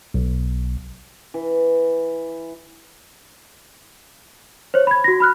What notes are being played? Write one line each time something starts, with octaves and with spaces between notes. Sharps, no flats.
B1
E3
C5 C#5
B5 G#6
F#4 A#6
B5 F6 F#6